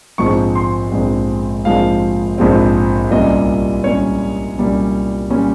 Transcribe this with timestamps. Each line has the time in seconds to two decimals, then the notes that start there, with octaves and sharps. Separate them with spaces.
0.18 A#1 G#2 F3 G#3 C4 C#6
0.55 C6
0.92 A#1 G#2 F3 G#3 C4
1.65 A#1 G#2 F3 G#3 C4 F5
2.38 A#1 G#2 F3 G#3 C4
3.11 C2 A#2 G3 C#4 D#5
3.84 C2 A#2 G3 C#4 C#5
4.58 C2 A#2 G3 C#4
5.30 A#2 G3 C#4